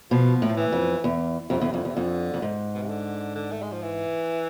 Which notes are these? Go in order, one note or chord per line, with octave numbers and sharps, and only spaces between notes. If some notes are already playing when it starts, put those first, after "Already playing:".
B2 F3
A2
F3
E3
F2
E2
F2 C3
E2 D3
C3
F2 D3
E2 C3
F2 D3
F2
G#2
B2
C3
D3
D3
A3
G#3
F3
E3